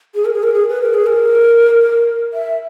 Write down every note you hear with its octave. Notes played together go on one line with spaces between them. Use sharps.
G#4
A#4
G#4
A#4
G#4
B4
A#4
G#4
A#4
E5